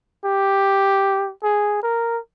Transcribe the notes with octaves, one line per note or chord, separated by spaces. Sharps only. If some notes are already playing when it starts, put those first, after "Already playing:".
G4
G#4
A#4